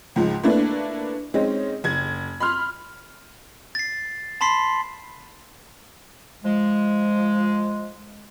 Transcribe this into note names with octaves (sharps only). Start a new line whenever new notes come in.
C#2 G#2 F3
A3 A#3 D4 E4 B4
G#3 C4 C#4 D#4
F#1 G#6
B5 C6 F6
A6 C7
A5 B5 C6 B6 C7
F3 G#3